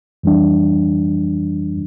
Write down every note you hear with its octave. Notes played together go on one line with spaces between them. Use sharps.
F2 E3 G3 D4